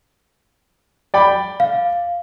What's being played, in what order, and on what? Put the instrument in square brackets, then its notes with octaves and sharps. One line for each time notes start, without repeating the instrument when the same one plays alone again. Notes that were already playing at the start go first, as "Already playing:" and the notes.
[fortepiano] D5 G5 B5
[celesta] F5